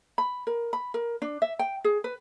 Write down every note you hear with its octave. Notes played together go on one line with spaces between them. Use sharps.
B5
A#4
B5
A#4
D4
E5
G5
G#4
B4